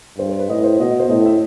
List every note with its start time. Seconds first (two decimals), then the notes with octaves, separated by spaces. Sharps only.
0.18 G2 C5
0.29 C5
0.39 B4
0.49 A2 D#5
0.64 C5
0.80 B2 D#5
1.00 C5
1.09 A2 D#5
1.26 E5